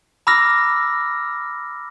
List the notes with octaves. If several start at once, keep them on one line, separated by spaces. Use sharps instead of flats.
A#5 B5 D6 E6 F6 A#6